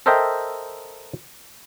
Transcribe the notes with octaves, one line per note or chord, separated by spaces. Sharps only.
A4 A#4 C5 D#5 E5 G5